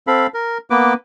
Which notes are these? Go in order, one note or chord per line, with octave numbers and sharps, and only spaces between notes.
C4 A4 F5 B5
A#4
A#3 B3 B4 D6